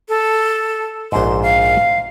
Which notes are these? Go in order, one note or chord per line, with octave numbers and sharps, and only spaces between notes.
A4
A#1 G#2 C6
F5